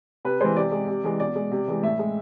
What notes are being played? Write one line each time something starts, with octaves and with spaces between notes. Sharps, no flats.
C3 B4
E3 G#3 C5
C3 D5
G#3
C3
E3 G#3
B2 D5
G#3
C3
E3 G#3
A2 E5
G#3